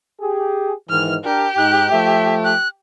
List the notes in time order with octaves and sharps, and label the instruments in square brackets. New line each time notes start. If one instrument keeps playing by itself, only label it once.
[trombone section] G4 G#4
[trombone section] G#2 D#3 E3 [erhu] F6
[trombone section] D4 A#4 [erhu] G4
[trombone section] G#2 D#4 [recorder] F#6
[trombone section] F3 A3 [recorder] E5
[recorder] F#6